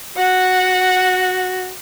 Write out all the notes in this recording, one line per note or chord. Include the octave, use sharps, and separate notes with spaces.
F#4 F#5